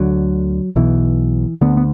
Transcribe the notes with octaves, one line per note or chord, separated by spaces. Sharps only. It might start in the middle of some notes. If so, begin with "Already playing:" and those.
Already playing: D2 D3 F#3
B1 B2 E3
D2 D3 B3
B3